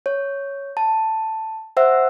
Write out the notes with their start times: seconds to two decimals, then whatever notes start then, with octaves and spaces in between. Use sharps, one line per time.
0.06 C#5
0.77 A5
1.77 C5 E5 F#5 E6